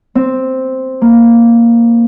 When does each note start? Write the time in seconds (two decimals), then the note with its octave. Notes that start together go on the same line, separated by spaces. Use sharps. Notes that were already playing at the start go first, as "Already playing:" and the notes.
0.15 C4
1.01 A#3